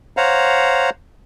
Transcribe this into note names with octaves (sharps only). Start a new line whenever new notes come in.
C5 C#5 F5 F#5 A#5